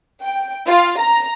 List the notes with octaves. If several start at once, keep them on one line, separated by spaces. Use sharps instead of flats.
G5
F4
A#5